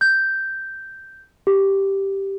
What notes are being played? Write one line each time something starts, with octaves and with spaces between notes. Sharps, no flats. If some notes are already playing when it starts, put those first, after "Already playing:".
G6
G4